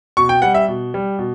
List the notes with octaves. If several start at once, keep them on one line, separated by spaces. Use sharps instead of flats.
B2 C#6
G5
G3 F#5
E5
B2
G3
B2